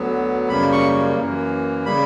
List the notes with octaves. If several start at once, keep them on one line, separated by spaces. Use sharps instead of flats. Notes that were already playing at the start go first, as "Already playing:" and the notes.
Already playing: D2 D3 F#3 B3
F#2 C#3 G3 A#3 B5
C#6
F#2 E3 A#3
C#3 G3 B5